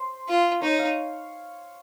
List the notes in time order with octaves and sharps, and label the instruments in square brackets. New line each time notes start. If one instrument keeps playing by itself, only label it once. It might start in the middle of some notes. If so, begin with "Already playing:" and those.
Already playing: [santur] C5
[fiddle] F4
[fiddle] D#4 [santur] C#5
[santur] F5